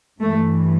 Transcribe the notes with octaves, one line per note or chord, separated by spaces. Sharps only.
G2 E3 A3